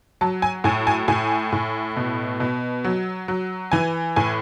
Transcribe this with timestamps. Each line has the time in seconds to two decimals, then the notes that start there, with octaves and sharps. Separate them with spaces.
0.21 F#3 A5
0.42 G#5
0.64 A2 G#5
0.87 G#5
1.08 A2 G#5
1.52 A2
1.96 B2
2.40 B2
2.84 F#3
3.28 F#3
3.72 E3 G#5
4.16 A2 G#5